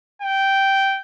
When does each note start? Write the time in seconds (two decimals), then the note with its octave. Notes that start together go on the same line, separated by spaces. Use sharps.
0.22 G5